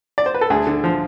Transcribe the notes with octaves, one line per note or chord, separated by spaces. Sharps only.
D5
C5
B4
A4
D2 G#4
D3
F3